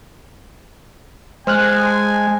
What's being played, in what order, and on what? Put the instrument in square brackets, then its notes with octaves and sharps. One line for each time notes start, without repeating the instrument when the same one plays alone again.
[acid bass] G#3 [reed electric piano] C5 F6 F#6 [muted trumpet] G#5